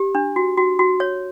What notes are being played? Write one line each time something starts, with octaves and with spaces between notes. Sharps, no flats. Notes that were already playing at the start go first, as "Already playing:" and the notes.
Already playing: G4
D4
F#4
F#4
F#4
C#5